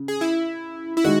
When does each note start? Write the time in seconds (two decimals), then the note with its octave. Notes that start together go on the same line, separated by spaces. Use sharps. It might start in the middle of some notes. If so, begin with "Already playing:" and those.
Already playing: C#3
0.08 G#4
0.21 E4
0.97 E4
1.04 D#3 G#3 F#4